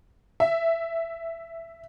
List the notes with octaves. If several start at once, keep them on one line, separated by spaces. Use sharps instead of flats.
E5